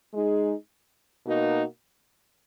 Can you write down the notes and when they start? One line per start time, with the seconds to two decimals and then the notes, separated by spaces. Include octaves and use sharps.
0.14 G#3 D#4 G#4
1.24 B2 A#3 D#4 F#4